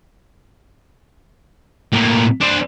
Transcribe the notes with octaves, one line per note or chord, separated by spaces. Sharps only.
A2 A#3
D4 C5